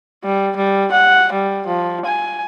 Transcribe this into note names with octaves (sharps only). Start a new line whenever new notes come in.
G3
G3
F#5
G3
F3
G#5